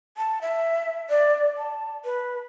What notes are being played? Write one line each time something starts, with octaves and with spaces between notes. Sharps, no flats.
A5
E5
D5
A5
B4